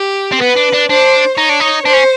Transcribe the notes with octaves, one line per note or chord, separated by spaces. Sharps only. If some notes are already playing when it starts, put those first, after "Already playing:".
Already playing: G4
C4
B3 B4
D4
D4
D4 C5
D#4 C#5
D4
D#4
D4 C5
C#4